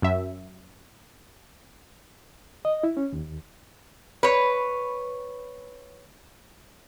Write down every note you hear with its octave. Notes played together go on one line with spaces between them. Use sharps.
F#2 E5
D#5
E4
C#4
D#2
B4 C#5